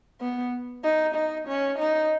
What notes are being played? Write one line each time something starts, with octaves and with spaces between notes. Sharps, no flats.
B3
D#4
D#4
C#4
D#4